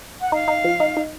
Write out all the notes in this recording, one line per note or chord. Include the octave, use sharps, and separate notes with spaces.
F#5
D#4 F5
D#4
F3
D#4
D#4